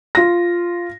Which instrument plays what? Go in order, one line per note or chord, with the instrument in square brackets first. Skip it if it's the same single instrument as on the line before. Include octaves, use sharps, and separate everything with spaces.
[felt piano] F4 A#6